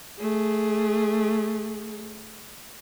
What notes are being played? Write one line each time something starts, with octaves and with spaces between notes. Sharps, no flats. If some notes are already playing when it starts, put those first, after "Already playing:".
A3 G#4